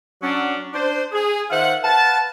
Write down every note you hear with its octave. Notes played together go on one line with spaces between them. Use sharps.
F#3 C#4 D4
D4 C5
G#4
D#3 F4 C5 E5 F#5
B4 F5 F#5 A5